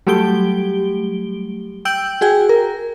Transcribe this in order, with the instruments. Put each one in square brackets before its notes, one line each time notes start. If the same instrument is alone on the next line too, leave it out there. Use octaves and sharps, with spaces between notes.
[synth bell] F#3 G3 A3 G4 D7 G7
G5 E6 G6 D7 F#7
F#4 G#4 G5 G#5
A#4